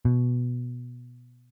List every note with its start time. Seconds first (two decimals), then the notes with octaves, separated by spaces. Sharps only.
0.05 B2